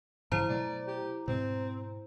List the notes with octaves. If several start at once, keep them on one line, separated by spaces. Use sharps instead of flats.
G2 C#3 F3 E4 C5 A#5
B2 F#3 A3 D5
G4
G#2 B2 C4